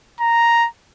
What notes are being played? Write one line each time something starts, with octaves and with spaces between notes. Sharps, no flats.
A#5